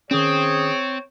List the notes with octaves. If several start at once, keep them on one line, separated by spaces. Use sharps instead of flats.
D#3 C4 C#4 G#4 C#5